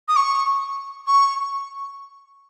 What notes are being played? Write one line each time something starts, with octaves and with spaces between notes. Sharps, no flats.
D#6
C#6
C#6